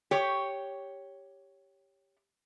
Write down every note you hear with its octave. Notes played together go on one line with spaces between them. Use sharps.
G4 C#5